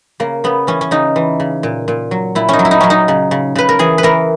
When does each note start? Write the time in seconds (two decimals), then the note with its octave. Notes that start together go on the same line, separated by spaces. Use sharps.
0.20 C#3 A#3
0.44 C#3 B3
0.67 E3 C#4
0.81 C#4
0.91 C#3 D#4
1.16 E3
1.40 C#3
1.63 A#2
1.88 A#2
2.11 F#3
2.35 A#2 E4
2.49 C#4 D#4
2.59 F#3
2.65 E4
2.71 D#4
2.81 F#3 C#4
2.90 D#4
3.08 C#3
3.31 C#3
3.55 C#3 B4
3.69 A#4
3.79 E3 G#4
3.98 B4
4.03 E3 A#4